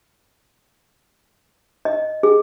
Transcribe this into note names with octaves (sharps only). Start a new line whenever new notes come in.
D#5
G#4